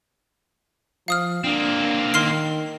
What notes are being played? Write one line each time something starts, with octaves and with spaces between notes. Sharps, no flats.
F3 F5 D#6 F6
A#3 C4 D4
D#3 C6 F6 C7